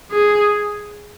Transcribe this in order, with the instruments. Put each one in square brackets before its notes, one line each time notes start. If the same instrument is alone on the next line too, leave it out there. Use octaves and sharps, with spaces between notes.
[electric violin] G#4